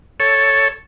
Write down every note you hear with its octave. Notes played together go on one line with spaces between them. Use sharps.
A4 C#5